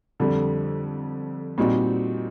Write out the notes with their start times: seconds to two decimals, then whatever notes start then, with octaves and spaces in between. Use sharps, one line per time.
0.20 F2 D3 G3
1.58 A#2 G3 C4 D#4 F#4